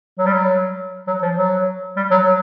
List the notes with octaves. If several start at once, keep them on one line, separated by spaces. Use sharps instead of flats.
F#3
G3
F#3
F#3
F3
F#3
G3
F#3
F#3